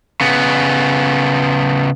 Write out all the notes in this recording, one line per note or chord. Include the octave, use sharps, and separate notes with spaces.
C#3 B3